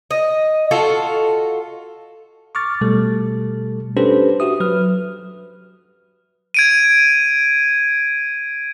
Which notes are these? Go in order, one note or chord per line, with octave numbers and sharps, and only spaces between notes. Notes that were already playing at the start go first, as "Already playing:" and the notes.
D#5
F4 F#4 A4
C#6 D6 F6 A6
B2 G3 A3 A4
C#4 D4 G4 A4 B4 C5
F#4 G4 E5 D#6
F#3 B4 F6
G#6 D7 D#7